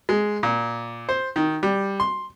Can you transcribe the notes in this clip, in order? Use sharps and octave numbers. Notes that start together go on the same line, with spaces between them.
G#3
A#2
C5
D#3
G3
C6